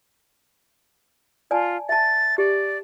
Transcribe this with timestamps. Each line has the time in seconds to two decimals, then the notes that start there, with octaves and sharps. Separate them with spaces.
1.51 F4 D5 G#5 A5
1.89 E5 A5 A6
2.38 G4 D5